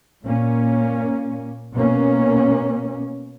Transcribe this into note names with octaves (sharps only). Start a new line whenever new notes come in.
A#2 A#3 C#4
B2 A#3 C#4